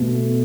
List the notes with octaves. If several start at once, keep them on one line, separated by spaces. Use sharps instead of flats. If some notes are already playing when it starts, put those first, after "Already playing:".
Already playing: B2 A3